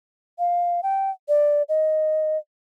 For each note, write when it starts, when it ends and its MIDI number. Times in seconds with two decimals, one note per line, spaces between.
0.39 0.81 77
0.83 1.10 79
1.28 1.63 74
1.69 2.37 75